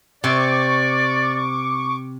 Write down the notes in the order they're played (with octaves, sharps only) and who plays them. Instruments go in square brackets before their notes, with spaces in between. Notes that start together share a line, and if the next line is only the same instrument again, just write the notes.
[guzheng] C3 [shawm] D5 [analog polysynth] C#6 D6